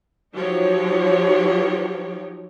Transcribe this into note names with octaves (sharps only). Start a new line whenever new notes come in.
F3 F#3 D#4 G4 C#5